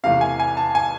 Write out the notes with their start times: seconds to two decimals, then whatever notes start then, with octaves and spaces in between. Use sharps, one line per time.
0.03 E2 C3 E3 A3 F5
0.21 G#5
0.40 G#5
0.57 A5
0.75 G#5